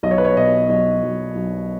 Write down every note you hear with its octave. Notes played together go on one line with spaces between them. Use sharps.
B1 D#5
C#5
B4
C#5
B2 D#5
B1 D#5
B1
B1